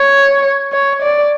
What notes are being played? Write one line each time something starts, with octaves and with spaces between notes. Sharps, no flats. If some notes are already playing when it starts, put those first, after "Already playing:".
Already playing: C#5
C#5
D5